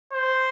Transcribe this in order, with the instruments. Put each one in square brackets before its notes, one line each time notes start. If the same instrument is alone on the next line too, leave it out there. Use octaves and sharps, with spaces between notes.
[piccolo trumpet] C5